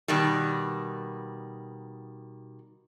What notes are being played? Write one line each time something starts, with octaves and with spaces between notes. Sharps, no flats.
B2 D#3 G3